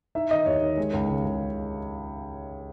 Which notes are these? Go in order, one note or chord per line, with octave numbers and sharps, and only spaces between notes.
D#4 E5
D#3 D#5
D#2 C#5
D#3
G#3
C#2
C#3
C#3